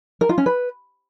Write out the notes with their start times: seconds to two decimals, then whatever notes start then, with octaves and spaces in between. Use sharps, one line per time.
0.21 A#4
0.29 F4
0.38 C#4
0.46 B4